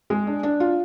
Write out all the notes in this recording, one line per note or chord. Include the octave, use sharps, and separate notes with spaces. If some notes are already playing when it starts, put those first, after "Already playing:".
G#3
D4
D4
F4